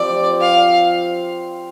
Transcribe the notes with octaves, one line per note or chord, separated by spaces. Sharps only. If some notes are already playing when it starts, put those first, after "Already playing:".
Already playing: F3 C4 G4 D5
F5